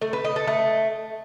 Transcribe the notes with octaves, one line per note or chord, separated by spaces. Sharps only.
A3
B4
D#5
A4
A3